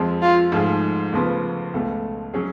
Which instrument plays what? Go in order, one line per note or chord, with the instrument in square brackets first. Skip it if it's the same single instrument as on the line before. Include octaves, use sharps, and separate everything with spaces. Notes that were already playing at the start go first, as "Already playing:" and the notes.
Already playing: [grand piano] F2 F3 G#3
[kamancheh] F4
[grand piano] G#2 F3 A3 F4 G#4
D2 C#3 F3 B3 F4
C#2 B2 A3
F#3 C#4 G#4